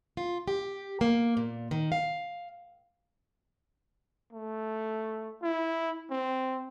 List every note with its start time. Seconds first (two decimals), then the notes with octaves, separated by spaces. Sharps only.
0.17 F4
0.48 G4
1.01 A#3
1.37 A#2
1.71 D#3
1.92 F5
4.33 A3
5.43 E4
6.10 C4